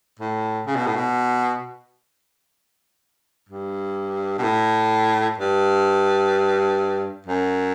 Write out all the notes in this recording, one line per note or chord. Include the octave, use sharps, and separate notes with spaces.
A2
C#3
B2
A2
B2
G2
B2
A2
G2
F#2